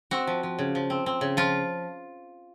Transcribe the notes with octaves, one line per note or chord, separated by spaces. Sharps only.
C4 F#4
F3
F3
C#3
F3
C4
C4
C#3
F3 F4